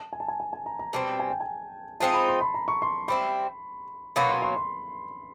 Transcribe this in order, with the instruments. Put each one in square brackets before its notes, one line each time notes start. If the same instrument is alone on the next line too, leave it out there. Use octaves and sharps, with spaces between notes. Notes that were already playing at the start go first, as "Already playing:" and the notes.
Already playing: [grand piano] A5
G#5
A5
G#5
G#5
G#5
A#5
A#5
[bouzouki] B2 G3 C4 [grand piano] A5
[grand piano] G#5
G5
G#5
[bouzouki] F3 G#3 C4 D#4 [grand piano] A5
[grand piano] B5
C6
B5
A#5
C#6
C6
[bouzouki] G3 C4 E4 [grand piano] B5
[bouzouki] B2 F#3 A#3 C#4 [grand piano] B5
[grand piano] C6
C6
C6